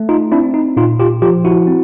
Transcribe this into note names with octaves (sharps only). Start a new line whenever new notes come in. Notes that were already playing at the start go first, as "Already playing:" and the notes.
Already playing: A3
D#4 F4
C4 D4 E4
D#4
A#2 D#4 F4
F4 G4
F3 F4 G4
E4 F#4
C4